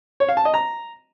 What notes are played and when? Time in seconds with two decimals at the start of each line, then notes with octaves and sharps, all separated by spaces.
0.20 C#5
0.29 F5
0.37 A5
0.45 D#5
0.54 A#5